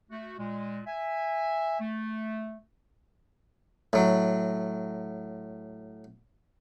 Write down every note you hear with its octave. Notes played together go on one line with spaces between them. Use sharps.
A3 F#4
A#2 G#3
E5 G#5
A3
A2 F#3